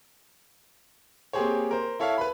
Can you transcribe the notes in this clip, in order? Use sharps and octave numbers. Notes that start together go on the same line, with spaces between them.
A#3 C4 G4 G#4 C5 C#5
A#4 C5
E4 A4 C#5 E5 F5
B4 B5